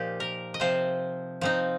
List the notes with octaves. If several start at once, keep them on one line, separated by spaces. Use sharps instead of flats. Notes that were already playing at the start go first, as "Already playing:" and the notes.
Already playing: A#2 F3 D#4 G4
A#4
D#5
C3 F3 C4 C5
F3 C4 D#4